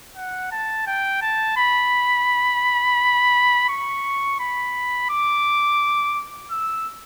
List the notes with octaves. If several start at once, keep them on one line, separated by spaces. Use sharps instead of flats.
F#5
A5
G5
A5
B5
C#6
B5
D6
E6